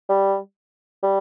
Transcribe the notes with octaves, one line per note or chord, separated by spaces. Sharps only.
G3
G3